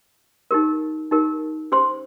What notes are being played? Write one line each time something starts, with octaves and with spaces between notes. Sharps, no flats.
D#4 G4 A#4
D#4 G4 A#4
C#4 G4 C5 C6